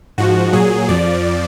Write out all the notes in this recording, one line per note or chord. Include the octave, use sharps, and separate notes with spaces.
G#2 F3 F#4
A#2 F#3 G#4
F2 F3 D5